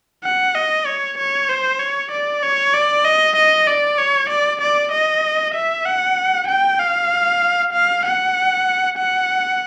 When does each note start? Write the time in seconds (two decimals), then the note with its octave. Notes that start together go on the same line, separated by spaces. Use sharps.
0.24 F#5
0.55 D#5
0.86 C#5
1.18 C#5
1.49 C5
1.80 C#5
2.12 D5
2.43 C#5
2.74 D5
3.05 D#5
3.36 D#5
3.68 D5
3.98 C#5
4.30 D5
4.61 D5
4.92 D#5
5.54 E5
5.86 F#5
6.48 G5
6.79 F5
7.73 F5
8.05 F#5
8.98 F#5